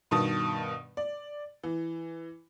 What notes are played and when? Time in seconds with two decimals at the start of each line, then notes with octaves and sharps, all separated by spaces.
0.11 G2 B2 D#3 A5 D#6
0.97 D5
1.63 E3